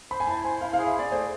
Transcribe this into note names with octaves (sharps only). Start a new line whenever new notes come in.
C5 B5
G#5
E4 A5
C5 G#5
E4 F5
G#4 F5
E5
G#4 D5
A3 C5